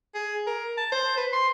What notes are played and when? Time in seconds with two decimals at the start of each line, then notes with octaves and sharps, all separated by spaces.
0.15 G#4
0.47 A#4
0.77 A5
0.92 C5
1.17 B4
1.33 C6